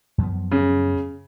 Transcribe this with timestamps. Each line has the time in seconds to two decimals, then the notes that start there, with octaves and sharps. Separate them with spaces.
0.18 F#2 F3 B3
0.51 C#3